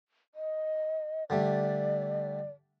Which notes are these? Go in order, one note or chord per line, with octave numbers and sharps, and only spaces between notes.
D#5
D3 G3 A3 D5